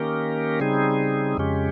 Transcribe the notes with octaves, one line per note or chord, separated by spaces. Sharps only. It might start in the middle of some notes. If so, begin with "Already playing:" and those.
Already playing: D#3 A#3 C#4 G4 A#4
C#3 G3 C4 D#4 G#4
F2 C#3 G#3 C#4 G4